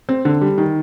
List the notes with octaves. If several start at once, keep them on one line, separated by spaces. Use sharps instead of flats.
C4
D3
G3
D#3